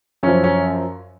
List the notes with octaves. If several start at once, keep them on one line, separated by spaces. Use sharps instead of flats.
F#2 F3 C#4
C#4